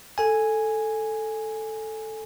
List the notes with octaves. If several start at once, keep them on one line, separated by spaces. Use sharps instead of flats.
A4 G#5